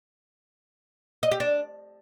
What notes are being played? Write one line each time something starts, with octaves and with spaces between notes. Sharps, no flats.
D#5
G4
D4